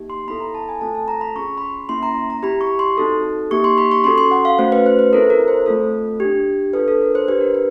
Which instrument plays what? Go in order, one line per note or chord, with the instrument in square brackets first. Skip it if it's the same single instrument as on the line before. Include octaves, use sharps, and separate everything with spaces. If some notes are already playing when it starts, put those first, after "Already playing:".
Already playing: [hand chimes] A#3 D#4 G4
C6
B3 E4 A4 B5
A#5
A5
G#5
A3 C4 F4 A4 A5
A5
A#5
B5
C#4 F4 G#4 C#6
B5
C6
A#3 C#4 E4 C6
A#5
A#5
C4 E4 G4 B5
C#6
C6
C4 D#4 F#4 A4
A#3 D#4 G4 C#6
C6
B5
C#6
C#4 F#4 A4 C6
C6
F#5
F5
A3 C#4 F#4 C5
B4
C5
B4
C4 E4 A4 A#4
A#4
C5
A3 C4 F4 A4
D4 G4
D4 F4 A4 B4
A4
A#4
C5
D4 G4 B4
A#4
B4